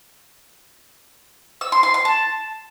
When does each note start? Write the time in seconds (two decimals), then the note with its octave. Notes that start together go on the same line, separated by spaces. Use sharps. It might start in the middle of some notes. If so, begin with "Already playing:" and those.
1.61 E6
1.72 C6
1.83 C6
1.94 C6
2.05 A5